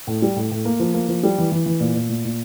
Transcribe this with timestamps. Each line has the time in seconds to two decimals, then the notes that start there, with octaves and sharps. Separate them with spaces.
0.07 A2
0.22 G3
0.36 A2
0.51 A2
0.65 A#3
0.80 F3
0.94 A#3
1.09 F3
1.23 G3
1.38 E3
1.52 E3
1.66 E3
1.80 A#2
1.96 A#2
2.10 A#2
2.25 A#2